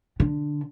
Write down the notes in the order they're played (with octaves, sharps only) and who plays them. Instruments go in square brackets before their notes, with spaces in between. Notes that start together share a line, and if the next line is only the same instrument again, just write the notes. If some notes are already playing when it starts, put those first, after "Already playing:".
[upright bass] D3